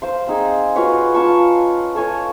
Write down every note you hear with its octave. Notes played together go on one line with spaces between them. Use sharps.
C5 F5 C6
C4 D#4 G#4
F4 F#4 B4 C#5
C#4 F4 A5 C#6
A4 C#5 G#5 C#6